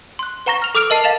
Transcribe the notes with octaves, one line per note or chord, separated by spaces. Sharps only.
C6 F#6
B4 F#5 A#5 C#6 A#6 G7
F6 F7
A4 D6 E6 F6 D7 F7
A#4 D#5 A5 C7
D#5 F5 A6 E7 F7